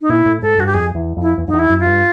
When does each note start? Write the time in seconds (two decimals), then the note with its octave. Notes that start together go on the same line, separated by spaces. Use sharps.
0.01 D#4
0.09 A#2 E4
0.25 A2
0.42 G#2 A4
0.58 G2 F#4
0.66 G4
0.74 F2 G#4
0.95 E2
1.17 F2 E4
1.38 E2
1.48 F2 D#4
1.53 E2
1.59 E4
1.69 F#2
1.80 F4
1.86 G2